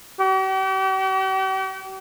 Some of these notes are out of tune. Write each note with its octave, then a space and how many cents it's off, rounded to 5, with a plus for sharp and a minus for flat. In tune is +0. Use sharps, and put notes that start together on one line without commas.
G4 -45